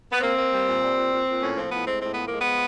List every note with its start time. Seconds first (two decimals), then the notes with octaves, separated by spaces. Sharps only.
0.12 B3
0.21 A#3 C4
0.36 A#3
0.51 G3
0.66 A#2
0.81 G3
0.96 A#2
1.11 A#2
1.26 A#2
1.41 A2 C#4
1.56 F3 C4
1.70 A2 B3
1.86 G#3 C4
2.01 A2 C4
2.14 F3 B3
2.27 G#3 A#3
2.40 B3
2.45 F3